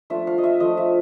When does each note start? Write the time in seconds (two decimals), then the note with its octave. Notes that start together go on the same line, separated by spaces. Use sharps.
0.10 F3 A3 D4 F4 E5
0.27 F5
0.38 D#5
0.43 E5
0.60 F3 A3 D4 F4 D#5
0.77 E5